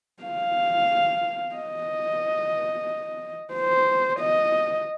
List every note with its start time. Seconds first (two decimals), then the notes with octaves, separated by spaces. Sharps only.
0.23 F5
1.55 D#5
3.53 C5
4.20 D#5